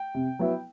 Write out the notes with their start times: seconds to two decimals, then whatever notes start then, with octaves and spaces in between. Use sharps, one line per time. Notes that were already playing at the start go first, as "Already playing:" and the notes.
Already playing: G5
0.15 C3
0.39 F#3 B3 E4